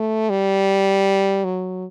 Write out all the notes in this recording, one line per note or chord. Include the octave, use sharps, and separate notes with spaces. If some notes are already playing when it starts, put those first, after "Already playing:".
Already playing: A3
G3
F#3